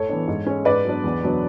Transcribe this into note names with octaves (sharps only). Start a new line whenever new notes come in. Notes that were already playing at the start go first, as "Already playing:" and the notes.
Already playing: A2 A4 C#5
E3 B3 D4
G#2
G#3 C#4
G#2 B4 D5
F#3 B3 D4
E2
B2 F#3 B3 D4